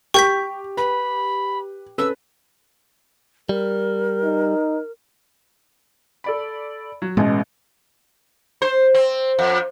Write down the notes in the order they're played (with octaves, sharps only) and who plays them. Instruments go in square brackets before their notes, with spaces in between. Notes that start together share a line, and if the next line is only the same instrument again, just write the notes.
[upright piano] G4 [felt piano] G5 [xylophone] C#6 G6 B6
[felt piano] B4 [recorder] B5
[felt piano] C#4 A4 B4 [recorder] E6
[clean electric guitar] G3 [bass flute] A#4
[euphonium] D#4
[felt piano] A4 D5 B5
F#3
[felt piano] A1 B2 D#5 [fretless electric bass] G#3 C#4
[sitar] C5
C4
F2